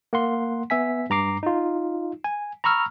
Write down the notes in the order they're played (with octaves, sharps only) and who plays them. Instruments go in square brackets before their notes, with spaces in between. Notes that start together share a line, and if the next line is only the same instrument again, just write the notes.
[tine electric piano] A#3 F#5 C6
B3 E5 G#5 B6
G2 A#5 D6 C7
D#4 F4
G#5
A#5 B5 C#6 E6 F6